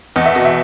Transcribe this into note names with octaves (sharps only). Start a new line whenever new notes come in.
E2 D#5
E5
B2 D#5
E5